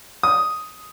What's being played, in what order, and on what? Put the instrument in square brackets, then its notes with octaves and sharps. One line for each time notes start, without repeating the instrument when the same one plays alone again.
[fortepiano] D#6